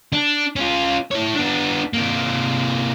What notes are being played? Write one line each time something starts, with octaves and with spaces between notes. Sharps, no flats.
D4
C#4 F4
E4 C#5
B3 D4
C3 A#3